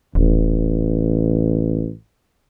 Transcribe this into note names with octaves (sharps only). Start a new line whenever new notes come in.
D#1 A1